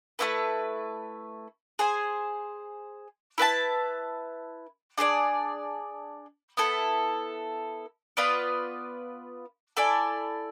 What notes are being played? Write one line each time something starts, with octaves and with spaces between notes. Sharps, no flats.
A3 C4 E4 B4
G#4 C5 G#5
E4 B4 E5 A5
D4 G#4 B4 D5
B3 E4 A4
B3 F4 B4 D5
E4 A4 D5 G#5